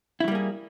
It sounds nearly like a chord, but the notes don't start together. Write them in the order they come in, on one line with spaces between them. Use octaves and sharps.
E4 F#3 G3 A#3 G#4